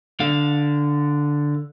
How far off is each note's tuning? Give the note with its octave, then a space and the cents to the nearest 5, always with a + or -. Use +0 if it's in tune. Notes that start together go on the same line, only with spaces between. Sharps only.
D3 +0 F5 +15